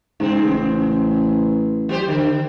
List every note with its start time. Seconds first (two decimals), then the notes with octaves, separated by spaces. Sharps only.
0.20 G#2 C#3 C4
0.42 A1
1.89 F#3 G4 C5
2.08 D3